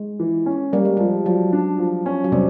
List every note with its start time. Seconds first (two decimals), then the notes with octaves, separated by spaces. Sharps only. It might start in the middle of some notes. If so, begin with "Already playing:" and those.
Already playing: G#3
0.20 E3
0.46 C#4
0.72 G3 A#3
0.85 G#3
0.97 F3 G3
1.26 F3 F#3
1.53 D4
1.78 F3
2.06 C#4
2.24 F#3
2.32 C3 G3